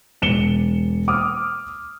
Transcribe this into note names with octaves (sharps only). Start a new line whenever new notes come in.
E1 C#7 E7 G7
D6 D#6 F6